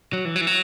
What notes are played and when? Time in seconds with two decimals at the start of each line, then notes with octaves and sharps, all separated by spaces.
0.13 F#3
0.25 E3
0.36 F#3
0.41 E3
0.47 F#3